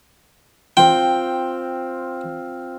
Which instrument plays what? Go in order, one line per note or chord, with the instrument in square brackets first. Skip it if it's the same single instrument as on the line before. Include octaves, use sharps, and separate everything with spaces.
[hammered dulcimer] C4 F4 [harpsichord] G5